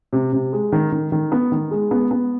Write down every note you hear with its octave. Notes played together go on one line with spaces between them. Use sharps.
C3
C3
G#3
D#3
D#3
D#3
B3
D#3
G#3
B3
B3